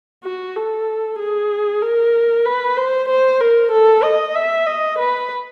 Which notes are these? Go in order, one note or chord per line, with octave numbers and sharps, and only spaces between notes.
F#4
A4
G#4
A#4
B4
C5
C5
A#4
A4
D#5
E5
D#5
B4